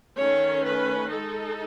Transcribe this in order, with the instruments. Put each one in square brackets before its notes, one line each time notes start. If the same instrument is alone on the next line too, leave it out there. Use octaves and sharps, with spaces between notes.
[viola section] D#3 A3 C#4 C#5
B4
G#3 D#4 A4